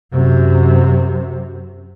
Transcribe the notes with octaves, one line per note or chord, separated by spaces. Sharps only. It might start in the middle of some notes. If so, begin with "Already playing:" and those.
F#2 C3